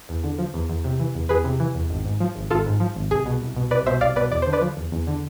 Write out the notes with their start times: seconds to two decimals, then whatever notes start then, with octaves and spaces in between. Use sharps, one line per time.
0.09 E2
0.24 D3
0.39 F3
0.54 E2
0.70 E2
0.84 C3
1.00 E3
1.15 E2
1.29 E2 G#4 B4
1.44 C3
1.60 E3
1.75 E2
1.90 G#1
2.05 G#2
2.20 F3
2.36 G#1
2.51 G#1 F4 A4
2.66 G#2
2.80 F3
2.96 G#1
3.11 C2 G#4
3.26 B2
3.42 C2
3.56 B2
3.71 C2 B4 D5
3.86 B2 C5 E5
4.01 C2 D5 F5
4.16 B2 B4 D5
4.31 E2 D5
4.42 D3 C5
4.53 B4 D5
4.61 F3
4.77 E2
4.92 E2
5.07 D3